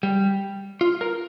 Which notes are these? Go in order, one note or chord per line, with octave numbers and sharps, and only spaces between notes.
G3
F4
A#4